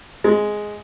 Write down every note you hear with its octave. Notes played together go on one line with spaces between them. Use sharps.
G#3